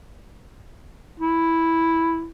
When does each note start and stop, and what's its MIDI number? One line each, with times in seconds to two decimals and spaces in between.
1.20 2.28 64